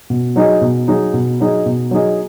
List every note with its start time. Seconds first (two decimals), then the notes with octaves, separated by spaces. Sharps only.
0.10 B2
0.36 F#3 D#4 G#4 D#5
0.61 B2
0.88 F#3 D#4 G#4 D#5
1.14 B2
1.40 F#3 D#4 G#4 D#5
1.66 B2
1.91 F#3 D#4 G#4 D#5